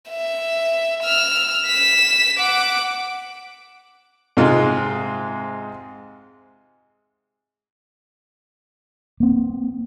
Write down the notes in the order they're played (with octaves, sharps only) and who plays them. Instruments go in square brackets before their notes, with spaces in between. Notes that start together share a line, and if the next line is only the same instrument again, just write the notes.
[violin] E5
E6 F6
B6 E7
F#5 D6
[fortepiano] G#2 C3 G#3 F4
[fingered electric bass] A#3 C4